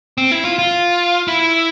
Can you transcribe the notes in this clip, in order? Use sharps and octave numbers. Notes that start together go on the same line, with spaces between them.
C4
E4
F4
F4
E4